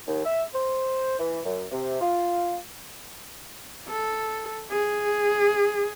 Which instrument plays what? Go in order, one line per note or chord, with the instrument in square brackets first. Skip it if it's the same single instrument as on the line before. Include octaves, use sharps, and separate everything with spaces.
[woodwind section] D#2
E5
C5
E3
F#2
C3
F4
[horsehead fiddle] A4
G#4